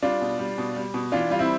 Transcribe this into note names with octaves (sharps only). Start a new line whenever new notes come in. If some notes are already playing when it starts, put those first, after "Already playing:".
G3 D4 F4
B2
G3
B2
G3
B2
E3 D4 F4
G3 F4
C4 E4